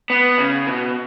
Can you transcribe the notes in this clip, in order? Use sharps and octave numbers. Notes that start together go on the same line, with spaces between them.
B3
C#3
B2